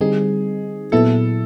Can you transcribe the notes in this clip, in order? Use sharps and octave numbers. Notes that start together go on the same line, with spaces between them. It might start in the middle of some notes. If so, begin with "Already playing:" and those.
D3 G3 C4 D#4 G#4
A#2 F#3 B3 E4 A4